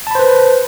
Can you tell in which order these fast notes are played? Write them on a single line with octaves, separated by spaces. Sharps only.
A5 B5 C5 B4